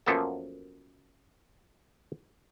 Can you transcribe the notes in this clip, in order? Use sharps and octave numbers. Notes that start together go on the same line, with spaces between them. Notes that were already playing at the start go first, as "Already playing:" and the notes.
F#2 F3 A#3 B3 A4 A5